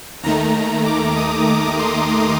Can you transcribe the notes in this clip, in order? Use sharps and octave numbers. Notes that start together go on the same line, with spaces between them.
D#2 D#3 A3 A#5
D6
D#6
D6
C6